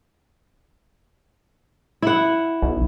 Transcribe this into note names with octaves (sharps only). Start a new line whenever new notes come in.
E4 F#5
B1